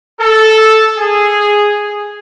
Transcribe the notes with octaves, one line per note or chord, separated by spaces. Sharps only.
A4
G#4